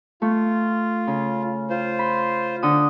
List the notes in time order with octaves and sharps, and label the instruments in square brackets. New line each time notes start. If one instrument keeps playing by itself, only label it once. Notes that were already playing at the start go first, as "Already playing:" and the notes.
[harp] A3 [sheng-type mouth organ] F4
[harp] C#3
[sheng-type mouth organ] F4 C5
[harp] B5
D3 D#6